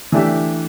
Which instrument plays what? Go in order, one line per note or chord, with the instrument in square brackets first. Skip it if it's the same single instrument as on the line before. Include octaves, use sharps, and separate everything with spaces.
[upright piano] E3 A3 D4 G4 E5